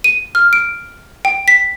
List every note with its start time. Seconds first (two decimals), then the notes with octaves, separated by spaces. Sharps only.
0.04 D#7
0.35 F6
0.53 D7
1.25 G5
1.48 B6